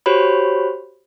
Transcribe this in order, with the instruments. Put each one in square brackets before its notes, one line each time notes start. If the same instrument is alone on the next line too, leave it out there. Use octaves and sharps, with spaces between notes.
[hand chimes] F#4 G4 C5 C#5 B5